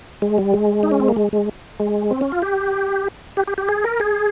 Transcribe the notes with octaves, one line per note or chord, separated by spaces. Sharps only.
G#3
G3
G#3
D#4
C#4
C4
A#3
G#3
G#3
G#3
C4
C#4
F4
G4
G4
G4
G4
G#4
A#4
G#4